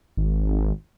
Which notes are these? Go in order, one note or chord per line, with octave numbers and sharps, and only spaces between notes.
G#1